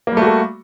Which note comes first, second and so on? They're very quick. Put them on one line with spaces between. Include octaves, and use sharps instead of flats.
A#3 G3 A3 F#4 A4